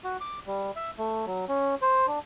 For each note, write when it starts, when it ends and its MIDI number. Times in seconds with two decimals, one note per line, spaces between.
0.04 0.17 66
0.21 0.39 86
0.47 0.71 55
0.76 0.91 76
0.98 1.25 57
1.26 1.45 54
1.48 1.75 61
1.82 2.06 72
2.07 2.19 62